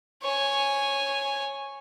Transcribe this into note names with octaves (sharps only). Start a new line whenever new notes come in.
C#5 G#5